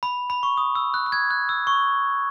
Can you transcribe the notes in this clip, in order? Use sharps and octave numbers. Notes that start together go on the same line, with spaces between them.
B5
B5
C#6
D#6
E6
F#6
F#6
G#6
F#6
E6
C#6